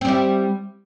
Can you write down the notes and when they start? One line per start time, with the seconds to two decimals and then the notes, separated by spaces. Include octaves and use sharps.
0.01 C4
0.05 G3
0.08 E4